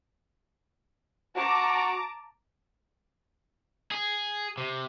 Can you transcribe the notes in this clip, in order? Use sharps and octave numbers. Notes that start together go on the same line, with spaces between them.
F#4 A5 A#5 D6
G#4
C3